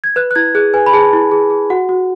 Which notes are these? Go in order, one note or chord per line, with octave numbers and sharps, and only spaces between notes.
G#6
B4 F#6
F#6
E4 G#6
G#4 F#6
B4 G#5
B5
G#4 A5
E4
G#4
G#4
F#4 F#5
F#4